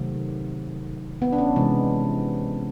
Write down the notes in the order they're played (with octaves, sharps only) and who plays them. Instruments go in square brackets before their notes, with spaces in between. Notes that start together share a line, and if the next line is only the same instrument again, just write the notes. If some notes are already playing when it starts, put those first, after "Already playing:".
Already playing: [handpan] C3 D#3 F#3 A3
B3
D4
C#4
C3 E3 G#3